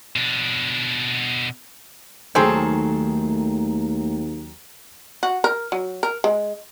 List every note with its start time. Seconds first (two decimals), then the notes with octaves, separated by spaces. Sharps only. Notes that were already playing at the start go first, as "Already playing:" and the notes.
0.16 B2 D4
2.35 D#2 D#3 F#3 A3 G#4 A4 C5 G5
5.23 F#4
5.44 A#4
5.72 F#3
6.03 A#4
6.24 G#3